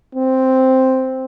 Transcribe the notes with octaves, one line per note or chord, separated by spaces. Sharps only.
C4